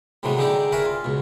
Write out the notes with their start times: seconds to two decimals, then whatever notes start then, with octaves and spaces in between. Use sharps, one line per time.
0.23 A2 C3 E3 F#3 G#3 B3
0.38 D3 G#3 D#4 G4 A4 D5
0.72 G#4 A#4 B4 C#5 E5 G#5
0.86 F4
1.04 C#2 B2